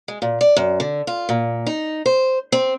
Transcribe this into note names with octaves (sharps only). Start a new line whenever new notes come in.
G#3
A#2
D5
F#2
D3
F4
A#2
D#4
C5
C4